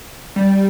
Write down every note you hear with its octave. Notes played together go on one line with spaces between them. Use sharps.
G3